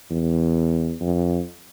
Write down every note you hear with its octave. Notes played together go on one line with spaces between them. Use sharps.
E2
F2